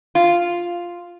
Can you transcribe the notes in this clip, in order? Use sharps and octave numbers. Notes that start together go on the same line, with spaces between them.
F4